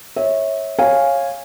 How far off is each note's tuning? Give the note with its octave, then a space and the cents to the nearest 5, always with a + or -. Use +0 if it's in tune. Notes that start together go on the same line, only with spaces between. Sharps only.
C#5 -15 E5 -25
C#5 -15 F5 +0 G#5 -10